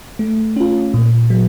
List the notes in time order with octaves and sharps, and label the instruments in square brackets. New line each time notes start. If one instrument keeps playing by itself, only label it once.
[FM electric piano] A3
C#4 F4
A#2
F#3